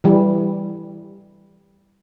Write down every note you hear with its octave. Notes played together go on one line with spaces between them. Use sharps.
E3 G3